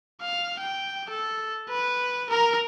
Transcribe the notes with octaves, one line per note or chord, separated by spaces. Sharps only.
F5
G5
A4
B4
A#4 A#5